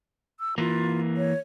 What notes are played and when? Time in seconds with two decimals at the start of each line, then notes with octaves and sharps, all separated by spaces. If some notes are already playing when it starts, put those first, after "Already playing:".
0.40 E6
0.58 E3 A#3 F4
1.17 C#5